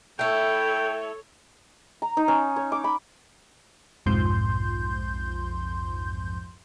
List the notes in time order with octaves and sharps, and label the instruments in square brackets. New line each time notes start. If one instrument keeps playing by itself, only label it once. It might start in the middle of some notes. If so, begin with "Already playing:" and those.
[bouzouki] A3 E4 [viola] A4 C#5 [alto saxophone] G5
[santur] A#5
D#4
C#4
C#5
D6
B5
[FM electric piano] B1 F2 G#2 F3 C6 G6